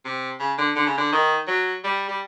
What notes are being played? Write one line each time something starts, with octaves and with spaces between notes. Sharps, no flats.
C3
C#3
D3
D3
C#3
D3
D#3
F#3
G3
G3